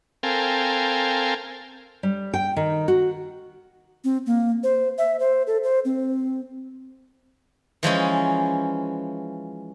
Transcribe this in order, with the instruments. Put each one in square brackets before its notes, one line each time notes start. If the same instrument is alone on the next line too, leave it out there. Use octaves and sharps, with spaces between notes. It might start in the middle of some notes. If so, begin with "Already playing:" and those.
[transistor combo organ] C4 A4 A#4 F5 G5 G#5
[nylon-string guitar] G3
G5
D#3
F#4
[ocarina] C4
A#3
C5
E5
C5
A4
C5
C4
[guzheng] E3 F3 G#3 C#4